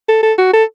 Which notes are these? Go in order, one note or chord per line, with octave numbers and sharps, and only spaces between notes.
A4
A4
F#4
A4